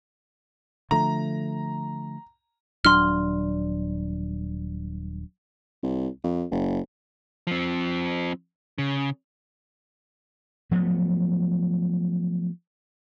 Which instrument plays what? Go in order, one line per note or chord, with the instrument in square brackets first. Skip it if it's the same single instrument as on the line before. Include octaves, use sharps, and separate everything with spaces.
[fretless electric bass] D3 F3 A3 [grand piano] A#5
[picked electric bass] D#1 F#3 D4 [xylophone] C6 F6
[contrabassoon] C2
F2
F#1
[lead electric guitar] F3 C4
C#3
[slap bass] F3 F#3 A3 B3